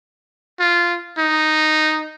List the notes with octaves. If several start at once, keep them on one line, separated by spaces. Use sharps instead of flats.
F4
D#4